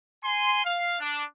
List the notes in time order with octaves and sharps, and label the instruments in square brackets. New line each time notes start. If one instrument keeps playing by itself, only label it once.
[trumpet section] G#5 C6
F5
D4